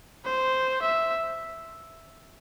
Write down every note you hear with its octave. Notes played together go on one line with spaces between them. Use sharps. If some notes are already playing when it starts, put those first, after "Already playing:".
C5
E5